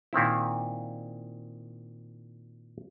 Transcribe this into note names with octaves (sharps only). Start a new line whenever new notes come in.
A#2 D#3 C4 E4